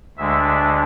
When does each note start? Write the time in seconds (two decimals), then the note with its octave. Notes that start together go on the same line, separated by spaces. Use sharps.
0.17 D2 D3 G#3 D4 E5